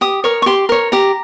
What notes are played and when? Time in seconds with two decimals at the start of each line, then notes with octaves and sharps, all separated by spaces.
0.01 G4 D#6
0.24 A#4 C#5 C#6
0.42 C#6
0.46 G4 C6
0.69 A#4 C#5
0.92 G4 A#5